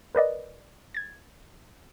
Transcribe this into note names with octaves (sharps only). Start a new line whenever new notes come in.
A#4 B4 D5 D#5
G#6 A6